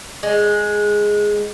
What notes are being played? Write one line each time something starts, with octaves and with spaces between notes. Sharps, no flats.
G#3